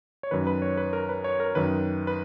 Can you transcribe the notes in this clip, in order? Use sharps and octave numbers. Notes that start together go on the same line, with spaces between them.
C#5
F#2 D#3 B4
B4
C#5
B4
A#4
B4
C#5
A#4
F#2 D#3 B4
B4